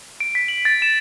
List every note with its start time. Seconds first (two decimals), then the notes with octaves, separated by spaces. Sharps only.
0.20 D7
0.35 B6
0.48 F#7
0.65 A6
0.82 E7